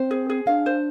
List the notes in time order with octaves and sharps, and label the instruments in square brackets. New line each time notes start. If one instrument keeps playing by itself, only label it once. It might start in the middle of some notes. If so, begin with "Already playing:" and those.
Already playing: [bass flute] C4 [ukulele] C5
[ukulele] G#4
G#4
[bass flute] D4 [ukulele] F5
[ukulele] C5